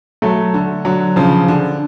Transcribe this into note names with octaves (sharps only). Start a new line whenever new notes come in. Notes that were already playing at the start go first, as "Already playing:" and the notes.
F#3 A3
D3
D3 F#3
C#3 F3
D3